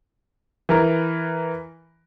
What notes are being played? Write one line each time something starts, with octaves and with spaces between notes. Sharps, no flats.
E3 A#4 A#5